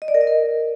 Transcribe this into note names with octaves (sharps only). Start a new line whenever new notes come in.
D#5
D5
A#4
D#5
A#4